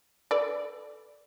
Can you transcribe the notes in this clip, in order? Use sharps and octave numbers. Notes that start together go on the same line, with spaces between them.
A4 B4 D5